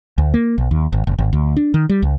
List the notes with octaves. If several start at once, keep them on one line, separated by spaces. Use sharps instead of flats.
D2
A#3
B1
D#2
G#1
F#1
G#1
D2
D4
D#3
G3
C#2